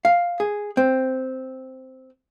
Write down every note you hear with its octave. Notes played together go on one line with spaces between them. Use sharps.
F5
G#4
C4